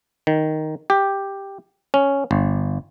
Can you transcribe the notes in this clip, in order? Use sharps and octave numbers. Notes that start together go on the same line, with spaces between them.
D#3
G4
C#4
G1